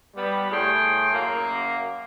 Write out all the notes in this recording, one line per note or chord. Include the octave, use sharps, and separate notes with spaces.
G3 B3
A2 G#4 G5 C6
F#2 A#3